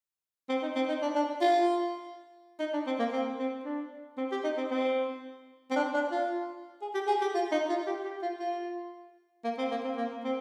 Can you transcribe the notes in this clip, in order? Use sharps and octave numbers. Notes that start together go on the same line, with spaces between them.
C4
D#4
C4
D#4
D4
D4
F4
D#4
D4
C4
A#3
C4
C4
D4
C4
G4
D#4
C4
C4
C4
D4
D4
F4
G#4
G4
G#4
G4
F4
D#4
F4
G4
G4
F4
F4
A#3
C4
A#3
C4
A#3
C4